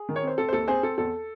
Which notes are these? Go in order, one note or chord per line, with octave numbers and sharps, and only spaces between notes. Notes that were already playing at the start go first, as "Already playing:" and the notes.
Already playing: G#4
D#3
C#5
C4 C5
C4 A4
C5
D#2 A4
C4 G#4 C5
C4 A4
E2 A4